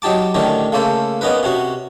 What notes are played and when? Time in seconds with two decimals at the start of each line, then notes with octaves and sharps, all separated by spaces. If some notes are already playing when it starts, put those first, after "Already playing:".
0.02 F#3 D#4 G4 A5 D6
0.34 A2 D3 D#3 C#4 G4
0.72 C#3 A3 A#3 A4 C5
1.21 B3 C#4 D#4 A#4 B4
1.43 C3 C#4 F#4